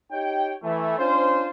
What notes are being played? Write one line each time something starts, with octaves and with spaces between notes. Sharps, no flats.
D#4 G4 C#5 G5
E3 A3
C#4 D4 F4 C5